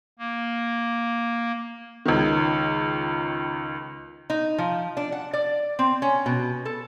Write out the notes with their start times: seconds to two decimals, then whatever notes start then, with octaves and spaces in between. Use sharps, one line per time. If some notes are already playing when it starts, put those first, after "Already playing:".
0.19 A#3
2.06 C#2 D#3
4.30 D#4
4.58 F3
4.97 D4
5.12 F#5
5.33 D5
5.79 C4
6.02 C#4
6.26 B2
6.65 A4